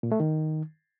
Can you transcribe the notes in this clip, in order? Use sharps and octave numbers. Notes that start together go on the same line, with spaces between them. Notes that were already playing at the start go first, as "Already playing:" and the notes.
A#2
A3
D#3